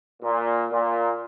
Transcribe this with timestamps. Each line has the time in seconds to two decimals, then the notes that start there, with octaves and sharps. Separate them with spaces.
0.23 A#2
0.72 A#2